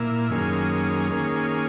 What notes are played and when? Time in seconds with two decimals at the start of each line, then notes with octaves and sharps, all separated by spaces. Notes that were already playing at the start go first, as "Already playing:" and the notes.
Already playing: A#2 A#3 E4
0.30 F#2 D#3 A#3 C#4 G#4
1.11 D#3 A#3 C#4 G#4